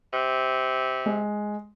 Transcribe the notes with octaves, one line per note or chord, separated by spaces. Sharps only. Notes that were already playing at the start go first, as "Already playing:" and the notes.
C3
G#3